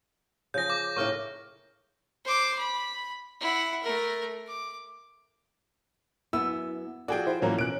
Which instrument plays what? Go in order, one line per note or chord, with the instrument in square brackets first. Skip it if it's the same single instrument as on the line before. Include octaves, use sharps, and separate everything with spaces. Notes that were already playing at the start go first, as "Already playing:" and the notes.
[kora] C#3 F3 G#4 [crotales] G6 A#6
[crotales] D6
[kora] A2 C#3 A#3 [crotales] C#6 F6
[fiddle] C5 D6
B5
E4 F#5
A3 A#4
D6
[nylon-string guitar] F#2 B3 [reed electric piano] E4 [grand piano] E6
[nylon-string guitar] F3 A4 [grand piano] F#4 G#4 G5 [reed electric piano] D5
[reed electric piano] E4 [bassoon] C5
[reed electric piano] A2 F#3 [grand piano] E3 A#3 A#5 [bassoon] C#4
[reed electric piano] B2 [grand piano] F#6 D7